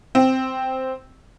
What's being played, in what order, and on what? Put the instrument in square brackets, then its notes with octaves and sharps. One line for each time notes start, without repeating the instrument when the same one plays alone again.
[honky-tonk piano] C4